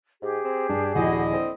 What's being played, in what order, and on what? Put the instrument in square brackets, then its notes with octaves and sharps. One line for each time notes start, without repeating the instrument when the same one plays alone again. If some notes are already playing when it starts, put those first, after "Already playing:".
[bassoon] G#2 [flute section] G4 G#4
[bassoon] C4
[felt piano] G2 [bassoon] D4
[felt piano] D#1 F3 G#5 [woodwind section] D3 E4 D#5 [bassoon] F#4
[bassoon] C4